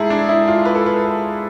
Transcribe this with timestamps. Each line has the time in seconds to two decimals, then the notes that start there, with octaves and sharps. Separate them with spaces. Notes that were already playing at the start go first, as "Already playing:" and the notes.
Already playing: G#2 E4 G#4 A4
0.10 D4
0.29 E4
0.48 F4
0.65 B4
0.75 A4
0.86 B4